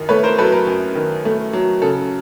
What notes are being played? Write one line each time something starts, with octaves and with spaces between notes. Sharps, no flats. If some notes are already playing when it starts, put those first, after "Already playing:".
Already playing: F#2 D#3
A3 B4 C#5
A#4 C5
F#3 A4 B4
A#4
F#2
D#3
A3
F#3
C#3 A4